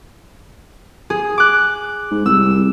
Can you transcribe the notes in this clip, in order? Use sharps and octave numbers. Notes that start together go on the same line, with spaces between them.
G#4
D6 F#6
G#2
C2 E6